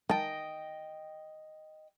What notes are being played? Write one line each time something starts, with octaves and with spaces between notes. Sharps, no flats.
D#3 D#5 G5 A5